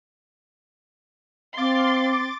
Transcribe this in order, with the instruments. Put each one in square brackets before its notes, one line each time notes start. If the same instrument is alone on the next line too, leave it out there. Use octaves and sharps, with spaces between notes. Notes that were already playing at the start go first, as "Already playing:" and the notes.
[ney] C4 [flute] F5 [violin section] C6 [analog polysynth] D6 A6